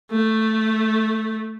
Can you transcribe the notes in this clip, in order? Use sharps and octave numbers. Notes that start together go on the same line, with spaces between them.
A3